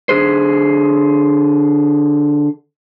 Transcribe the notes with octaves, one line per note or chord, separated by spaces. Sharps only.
D3 G#4 C5